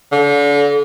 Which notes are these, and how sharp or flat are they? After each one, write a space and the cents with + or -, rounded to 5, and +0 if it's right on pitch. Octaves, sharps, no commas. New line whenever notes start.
D3 -35